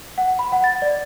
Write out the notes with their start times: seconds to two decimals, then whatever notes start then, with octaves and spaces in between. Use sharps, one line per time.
0.18 F#5
0.39 B5
0.52 F#5
0.64 A6
0.82 D5